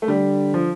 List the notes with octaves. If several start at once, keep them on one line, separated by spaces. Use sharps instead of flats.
A3
D3 G3
F3